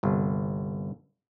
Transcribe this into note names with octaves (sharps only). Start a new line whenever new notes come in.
G1 C2